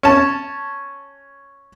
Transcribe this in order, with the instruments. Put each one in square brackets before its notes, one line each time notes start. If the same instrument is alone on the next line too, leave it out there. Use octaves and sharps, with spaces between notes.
[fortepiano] C#4 A5